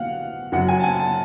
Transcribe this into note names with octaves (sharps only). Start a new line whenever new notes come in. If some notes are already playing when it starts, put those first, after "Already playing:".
Already playing: B2 F5 F#5
F#2 C#3 F#3 F#5
G#5
A5
G#5
A5